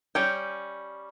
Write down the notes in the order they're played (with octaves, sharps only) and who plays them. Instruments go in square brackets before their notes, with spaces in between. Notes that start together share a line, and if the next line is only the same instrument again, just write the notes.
[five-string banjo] G3 C#4 G5